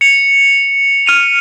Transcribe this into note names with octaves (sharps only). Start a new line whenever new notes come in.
C#7 F7
F6 D#7 F7